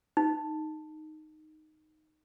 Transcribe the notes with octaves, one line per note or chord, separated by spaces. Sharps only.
D#4